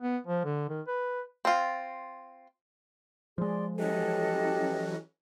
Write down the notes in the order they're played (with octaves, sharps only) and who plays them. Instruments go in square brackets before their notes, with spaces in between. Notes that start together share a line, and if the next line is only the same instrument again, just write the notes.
[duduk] B3
F3
D3
D#3
B4
[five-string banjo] C4 F4
[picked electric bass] F3 G#3 [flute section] G#4 D5 C6
[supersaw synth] E3 F#3 C#4 [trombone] G4 [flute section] A4 D#5 F#6